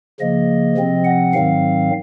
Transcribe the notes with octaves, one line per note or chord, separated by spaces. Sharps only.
C#3 F3 A#3 D#5
C3 F3 C4
F#5
G#2 D#3 F#3 C4 F5